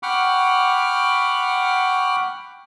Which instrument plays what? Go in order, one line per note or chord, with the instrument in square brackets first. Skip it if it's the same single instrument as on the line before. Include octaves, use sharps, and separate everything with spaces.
[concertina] F#5 G5 B5 C#6 D6 F6